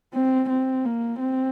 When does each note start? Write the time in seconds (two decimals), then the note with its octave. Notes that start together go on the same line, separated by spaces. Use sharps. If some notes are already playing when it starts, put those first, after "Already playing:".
0.14 C4
0.50 C4
0.85 A#3
1.21 C4